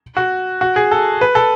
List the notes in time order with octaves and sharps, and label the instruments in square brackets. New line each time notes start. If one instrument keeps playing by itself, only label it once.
[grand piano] F#4
F#4
G#4
A4
B4
A4